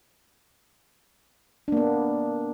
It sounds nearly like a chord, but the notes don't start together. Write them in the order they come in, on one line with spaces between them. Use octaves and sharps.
D4 A#3 B3